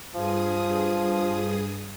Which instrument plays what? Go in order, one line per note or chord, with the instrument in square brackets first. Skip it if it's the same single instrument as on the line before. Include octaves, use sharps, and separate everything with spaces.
[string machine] G2 G#4 D#6 [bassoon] F3